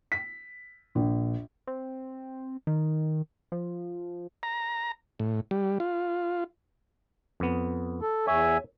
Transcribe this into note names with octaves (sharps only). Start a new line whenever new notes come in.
B6
A#1
C4
D#3
F3
A#5
A2
G3
F4
F2 B3
A4
E2 C#5 E5 G#5